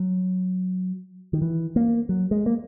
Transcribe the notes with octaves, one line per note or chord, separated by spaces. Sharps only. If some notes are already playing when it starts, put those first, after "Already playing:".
Already playing: F#3
D#3
E3
A#3
F#3
G#3
A#3